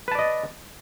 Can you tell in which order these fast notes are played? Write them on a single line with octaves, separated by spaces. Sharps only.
B4 A5 D5 D#5